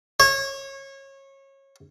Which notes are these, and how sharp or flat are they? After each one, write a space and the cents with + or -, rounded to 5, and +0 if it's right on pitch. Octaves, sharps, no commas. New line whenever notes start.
C#5 -25